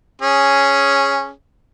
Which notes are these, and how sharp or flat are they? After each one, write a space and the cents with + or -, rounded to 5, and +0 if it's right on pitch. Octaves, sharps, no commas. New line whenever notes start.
C#4 +0 G#4 +0